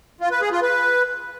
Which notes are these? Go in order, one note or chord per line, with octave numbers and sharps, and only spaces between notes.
F4
B4
G#4
F4
B4